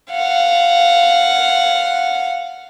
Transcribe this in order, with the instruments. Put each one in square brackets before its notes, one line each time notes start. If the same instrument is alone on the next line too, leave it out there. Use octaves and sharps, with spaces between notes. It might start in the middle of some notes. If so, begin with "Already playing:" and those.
[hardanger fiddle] F5 F#5